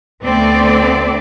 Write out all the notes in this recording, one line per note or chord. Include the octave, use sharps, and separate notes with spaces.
D2 A3 B3 C4 A4 D5